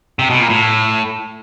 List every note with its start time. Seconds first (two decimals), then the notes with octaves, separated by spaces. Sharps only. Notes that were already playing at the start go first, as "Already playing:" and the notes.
0.19 C3
0.30 B2
0.40 A#2
0.50 A2